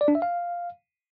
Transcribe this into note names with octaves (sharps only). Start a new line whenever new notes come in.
D5
D4
E5
F5